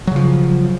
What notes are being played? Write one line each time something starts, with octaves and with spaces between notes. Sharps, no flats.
C#3 F3 F#3